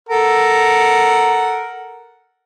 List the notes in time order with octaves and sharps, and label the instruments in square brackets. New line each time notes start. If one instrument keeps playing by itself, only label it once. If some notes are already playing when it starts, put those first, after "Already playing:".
[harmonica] A4 A#4 F#5